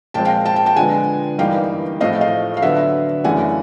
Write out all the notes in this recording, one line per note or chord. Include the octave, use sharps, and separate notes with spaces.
A#2 F3 G#3 C4 G5 A5
F5 G5
G5 A5
G5 A5
G5 A5
D3 F3 G#3 B3 F#5 G#5
G2 E3 G3 A#3 D#4 F5 G5
A2 F3 A3 C4 D#5 F5
D#5 F5
F5
D3 F#3 B3 E5 F#5
F#2 C#3 E3 A3 D4 F#5 G#5